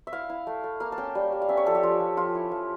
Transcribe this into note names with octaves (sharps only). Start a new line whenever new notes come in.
E5
E4 F5
E4
A3
A3
A#3 F5
A5
C#4 G5
G3
G3
F5
C#4 E5
C#5
F3 A4
G4
F3 F4
F3
F3 F4
E4
F3